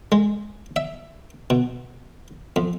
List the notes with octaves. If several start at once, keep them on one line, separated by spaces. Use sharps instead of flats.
G#3
E5
B2
F2